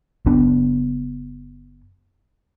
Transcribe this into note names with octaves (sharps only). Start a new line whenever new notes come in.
F#1 B3 D4